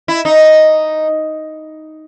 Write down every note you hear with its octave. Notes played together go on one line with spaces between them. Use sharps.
E4
D#4